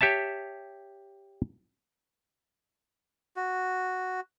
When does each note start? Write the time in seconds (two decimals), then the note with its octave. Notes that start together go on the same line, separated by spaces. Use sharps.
0.01 G4 C#5 E5 A5
3.36 F#4